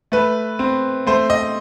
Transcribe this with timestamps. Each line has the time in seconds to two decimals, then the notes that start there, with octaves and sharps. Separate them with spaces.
0.12 A3 B4
0.59 C4
1.07 A3 C5
1.30 D#5